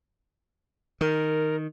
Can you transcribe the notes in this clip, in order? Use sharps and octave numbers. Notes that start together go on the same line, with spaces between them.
D#3 A#4